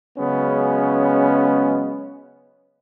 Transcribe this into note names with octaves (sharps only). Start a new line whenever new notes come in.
C#3 F#3 G#3 B3 C#4